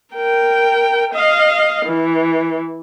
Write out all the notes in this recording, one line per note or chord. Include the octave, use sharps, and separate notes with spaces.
A#4 G5
D#5 F5
E3